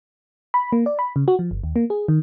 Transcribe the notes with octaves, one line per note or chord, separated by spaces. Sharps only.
B5
A#3
D5
B5
C#3
F#4
F3
G1
D#2
A#3
G#4
D#3